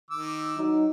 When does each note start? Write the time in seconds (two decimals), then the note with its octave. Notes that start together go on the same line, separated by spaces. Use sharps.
0.11 D#3 D6 E6
0.58 F#3 D#4